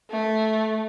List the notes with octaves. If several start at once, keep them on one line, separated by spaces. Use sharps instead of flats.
A3